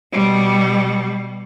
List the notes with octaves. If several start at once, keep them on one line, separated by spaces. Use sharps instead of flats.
B2 G3